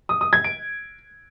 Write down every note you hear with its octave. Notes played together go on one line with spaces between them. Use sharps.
D#6
D#6
G#6
D7